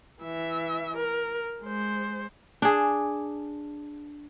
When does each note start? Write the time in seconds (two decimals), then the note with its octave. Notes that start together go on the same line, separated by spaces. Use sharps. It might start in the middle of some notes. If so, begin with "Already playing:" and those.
0.23 E3 E5
0.97 A#4
1.63 G#3 C5
2.62 D4 G#4